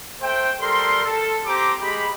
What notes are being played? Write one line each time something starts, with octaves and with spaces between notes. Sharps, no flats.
A3 C5 G5
G3 A4 A#4 C6
A4
C4 G4 C5 A#5 D6
G#3 G4 B5